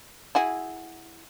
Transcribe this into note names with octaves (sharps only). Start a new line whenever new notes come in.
E4 F#4 G#4